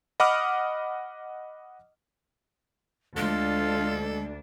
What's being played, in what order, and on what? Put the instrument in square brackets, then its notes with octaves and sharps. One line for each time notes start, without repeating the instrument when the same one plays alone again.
[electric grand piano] D#5 F#5 B5 D6 D#6 F6
[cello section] D2 D4 [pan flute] G#3 [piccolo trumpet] F4 [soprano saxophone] A4